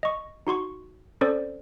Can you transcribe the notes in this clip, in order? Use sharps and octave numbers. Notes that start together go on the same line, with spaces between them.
D#5 C#6
D#4 F#4 C6 C#6
C4 C#4 A4 C5 D5